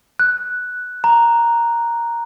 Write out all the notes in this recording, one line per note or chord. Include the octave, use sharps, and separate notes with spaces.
F#6
A#5